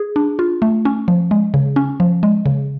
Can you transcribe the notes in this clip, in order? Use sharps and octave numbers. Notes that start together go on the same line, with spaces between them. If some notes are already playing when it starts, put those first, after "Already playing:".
Already playing: G#4
D4
F4
A3
C#4
F3
G#3
C#3
C#4
F3
G#3
C#3